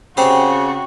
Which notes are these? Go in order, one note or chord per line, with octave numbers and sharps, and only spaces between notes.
C#3 C4 F#4 G4 C5